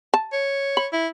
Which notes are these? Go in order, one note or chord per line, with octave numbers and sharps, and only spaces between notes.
A5
C#5
B5
E4